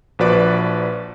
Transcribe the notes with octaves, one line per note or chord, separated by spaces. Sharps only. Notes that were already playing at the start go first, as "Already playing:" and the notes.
A#1 F3 F#4 B4 D5 D6